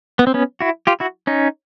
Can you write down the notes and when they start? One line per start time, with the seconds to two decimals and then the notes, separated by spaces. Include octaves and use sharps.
0.19 B3
0.27 C4
0.34 B3 C#4
0.61 E4 F#4
0.87 F4 G4
1.00 E4 F#4
1.27 C#4 D#4